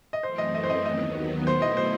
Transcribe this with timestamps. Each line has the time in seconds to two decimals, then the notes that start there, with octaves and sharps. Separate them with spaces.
0.13 D#5
0.23 F#2 E3 A3 C4 C5
0.38 D#5
0.55 D#5
0.64 C5
0.70 D#5
0.84 D#2 D#3 F#3 B3 D#5
1.46 B2 A3 E4 C5
1.62 D#5
1.77 C5